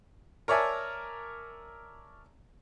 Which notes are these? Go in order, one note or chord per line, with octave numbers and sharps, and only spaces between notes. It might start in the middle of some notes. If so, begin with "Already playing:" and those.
A#4 C#5 D5 E5 G#5 A5